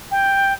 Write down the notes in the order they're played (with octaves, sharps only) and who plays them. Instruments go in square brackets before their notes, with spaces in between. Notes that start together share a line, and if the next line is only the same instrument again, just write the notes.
[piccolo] G5